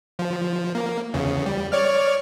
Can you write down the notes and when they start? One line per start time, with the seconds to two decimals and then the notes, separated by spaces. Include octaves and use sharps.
0.19 F3
0.75 A#3
1.14 E2 C#3
1.46 G3
1.72 C#5 D5 F6